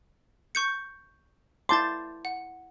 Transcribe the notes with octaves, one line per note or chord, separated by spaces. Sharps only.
C#6 G6 C#7
E4 A5 C6 D6 G6 A6
F#5